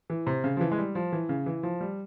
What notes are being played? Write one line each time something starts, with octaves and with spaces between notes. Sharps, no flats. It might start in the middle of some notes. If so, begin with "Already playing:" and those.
E3
C3
C#3
F3
E3
G#3
G3
F3
E3
C#3
E3
F3
G3